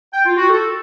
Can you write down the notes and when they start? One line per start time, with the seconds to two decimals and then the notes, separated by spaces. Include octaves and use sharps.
0.14 G5
0.26 F4
0.37 F#4
0.49 A4